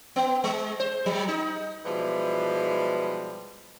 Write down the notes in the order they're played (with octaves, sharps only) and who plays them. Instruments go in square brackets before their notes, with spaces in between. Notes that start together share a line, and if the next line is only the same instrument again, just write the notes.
[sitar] B3
G#3
C5
F#3
D#4
[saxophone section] B2 E3 F3 G3 G#3